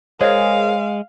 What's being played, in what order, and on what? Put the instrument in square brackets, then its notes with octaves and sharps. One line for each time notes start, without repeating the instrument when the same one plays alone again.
[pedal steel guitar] G#3 [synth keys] G#4 A#4 [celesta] C5 C#5 D#5 [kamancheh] F5